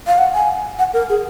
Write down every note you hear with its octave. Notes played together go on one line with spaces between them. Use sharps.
F5
F#5
G#5
F#5
A#4
G#4